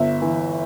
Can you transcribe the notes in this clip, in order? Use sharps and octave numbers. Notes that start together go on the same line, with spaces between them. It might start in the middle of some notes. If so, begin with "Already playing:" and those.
Already playing: G1 E5
E3